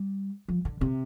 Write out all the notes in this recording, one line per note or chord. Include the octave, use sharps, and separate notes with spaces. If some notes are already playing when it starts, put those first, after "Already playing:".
Already playing: G3
F3
D3
C3